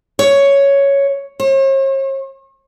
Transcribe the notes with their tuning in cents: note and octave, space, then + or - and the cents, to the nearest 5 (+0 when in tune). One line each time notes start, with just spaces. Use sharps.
C#5 +5
C#5 -45